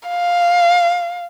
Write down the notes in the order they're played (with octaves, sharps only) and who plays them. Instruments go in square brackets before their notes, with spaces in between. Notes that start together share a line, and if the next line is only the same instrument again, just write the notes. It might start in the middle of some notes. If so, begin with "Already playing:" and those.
[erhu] F5